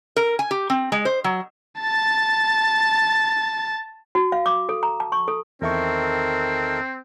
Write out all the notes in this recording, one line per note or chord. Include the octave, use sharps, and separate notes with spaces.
A#4
G#5
G4
C4
G#3
C5
F#3
A5 A6
F#4
F5
D6
A4
A#5
A5
C#6
A4
E2 D#3 C4 A4 A#4 E5 C#6